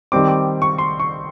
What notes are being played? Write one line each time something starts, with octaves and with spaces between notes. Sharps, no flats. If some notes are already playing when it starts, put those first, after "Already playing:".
D#3 G3 C4 D6
D6
C#6
C6
C#6